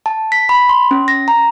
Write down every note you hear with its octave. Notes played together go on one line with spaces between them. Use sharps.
A5
B6
B5
C6
C#4
A#6
A#5